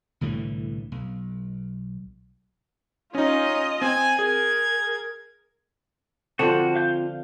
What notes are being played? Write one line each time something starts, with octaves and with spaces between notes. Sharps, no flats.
C2 A2 D3 E3
B1
C#4 D#4 F4 D#5
C4 G#5
G#4 A#4 G#6
D3 F3 C4 D4 F4 F#4 C5 A5
F5 G6